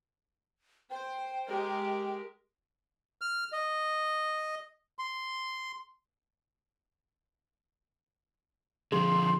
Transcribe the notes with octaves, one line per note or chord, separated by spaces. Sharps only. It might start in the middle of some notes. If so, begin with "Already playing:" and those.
C5 G5
G#3 G4 A#4
F6
D#5
C6
D3 F3 G#4 C6